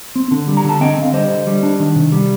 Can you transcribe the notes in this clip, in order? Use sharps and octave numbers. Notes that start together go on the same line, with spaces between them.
C4
D3
G3
A#5
D3 A5
C4 D#5 G5
D3 F5
G3 C5 D#5
D3
G3
D4
D#3
C3
G3